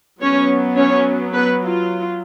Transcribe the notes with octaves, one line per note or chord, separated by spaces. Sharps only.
F#3 B3 C#4 C#5
C#4 C#5
B3 B4
F4